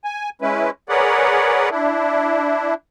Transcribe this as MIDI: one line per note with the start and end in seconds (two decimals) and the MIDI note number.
0.04 0.30 80
0.42 0.70 56
0.42 0.70 61
0.42 0.70 64
0.42 0.70 71
0.89 1.69 68
0.89 1.69 70
0.89 1.69 71
0.89 1.69 73
0.89 1.69 74
0.89 1.69 78
1.71 2.74 62
1.71 2.74 64